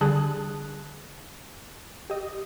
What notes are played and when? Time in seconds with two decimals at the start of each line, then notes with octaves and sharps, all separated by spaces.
0.01 D3 G3 G#4 A5 D#6 F#6
2.10 G4 D#5